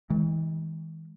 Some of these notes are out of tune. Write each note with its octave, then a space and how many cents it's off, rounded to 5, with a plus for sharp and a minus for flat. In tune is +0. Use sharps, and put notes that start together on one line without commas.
E3 -45 G#3 +0